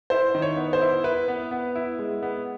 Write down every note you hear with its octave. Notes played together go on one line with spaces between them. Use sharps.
E4 C5
D#3
C#5
B3
C5
E4
E4 B4
B3
B3
E4
G#3
B3